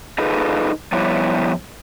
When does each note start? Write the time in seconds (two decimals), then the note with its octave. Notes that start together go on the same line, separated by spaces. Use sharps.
0.18 D#4 F4 G#4 A4 B4
0.92 F3 G3 B3 E4 G4 C#5